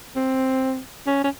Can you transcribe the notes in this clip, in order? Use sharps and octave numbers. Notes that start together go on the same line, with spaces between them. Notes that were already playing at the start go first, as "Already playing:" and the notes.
C4
C#4
C#4